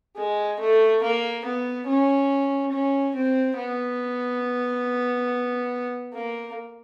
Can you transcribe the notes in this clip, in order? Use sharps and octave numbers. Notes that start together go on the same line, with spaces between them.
G#3
A3
A#3
B3
C#4
C#4
C4
B3
A#3